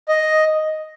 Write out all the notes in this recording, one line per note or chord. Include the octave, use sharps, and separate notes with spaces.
D#5